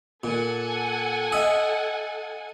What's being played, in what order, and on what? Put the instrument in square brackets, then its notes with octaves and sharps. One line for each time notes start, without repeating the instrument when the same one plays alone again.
[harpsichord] A#2 [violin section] A4 F#5 G#5
[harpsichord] D#5 E5